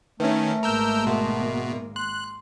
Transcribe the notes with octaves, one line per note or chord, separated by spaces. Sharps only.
D#3 A3 C#4 B4 E5
G#1 G#3 A#3 A#4 E6 G6
B2 A#4 E5 C6
C6 F#6